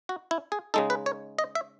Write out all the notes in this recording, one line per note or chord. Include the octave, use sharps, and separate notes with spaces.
F#4
E4
G#4
C#3 G#3 D#4 A4
B4
C#5
D#5
E5